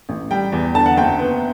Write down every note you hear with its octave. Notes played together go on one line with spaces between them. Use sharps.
A1
G3 G5
E2
D3 A5
F#5
F#1 G5
B3